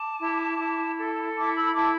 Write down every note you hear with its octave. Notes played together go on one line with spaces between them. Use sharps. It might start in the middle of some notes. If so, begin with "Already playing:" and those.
Already playing: A5 D6
E4
E4
A4
E4 A5 D6
B5 E6
B5
E4 A5 D6